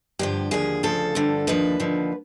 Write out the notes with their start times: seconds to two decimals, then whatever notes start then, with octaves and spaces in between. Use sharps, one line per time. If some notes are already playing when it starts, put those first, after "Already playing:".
0.19 G2 D3 F3 G4
0.51 D#2 D3 F3 G#4
0.83 D2 C#3 F3 A4
1.15 G2 D3 F3
1.47 D#2 D3 F3 B4
1.80 D#2 D3 F3